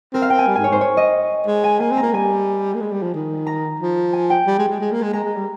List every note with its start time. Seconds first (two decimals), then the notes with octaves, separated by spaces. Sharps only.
0.13 C4 A#4
0.22 F5
0.30 C4 G5
0.39 G#5
0.47 G3
0.55 G#2 G#5
0.64 C#5
0.69 G#2 C5
0.81 C#5
0.97 D#5
1.46 G#3
1.64 G#5
1.80 A#3 G#5
1.91 C4
1.97 A#5
2.02 A#3
2.13 G3 G#5
2.74 A#3
2.81 G#3
2.91 G3
3.02 F3
3.14 D#3
3.47 A#5
3.80 F3
4.13 G#5
4.30 G5
4.46 G3
4.58 G#3
4.68 G#3
4.80 G#3
4.92 A#3
5.03 G#3
5.13 G#3 A#5
5.24 G#3
5.36 G3